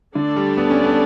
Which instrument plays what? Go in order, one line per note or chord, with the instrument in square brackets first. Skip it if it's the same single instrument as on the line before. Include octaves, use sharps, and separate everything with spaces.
[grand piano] D3 [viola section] A3 D4 A4 D5
[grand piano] G3
B3
C#4
B3